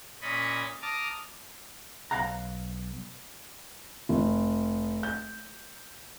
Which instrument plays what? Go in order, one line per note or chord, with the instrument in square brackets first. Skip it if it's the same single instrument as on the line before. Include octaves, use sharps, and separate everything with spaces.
[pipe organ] A#2 C#4 D#5 B5 C#6 A6
A5 A#5 D6 D#6 F6
[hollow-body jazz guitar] B1 F5 F#5 A#5
[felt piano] F1
G6